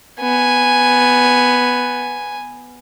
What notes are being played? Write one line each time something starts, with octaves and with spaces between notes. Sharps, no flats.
B3 G#5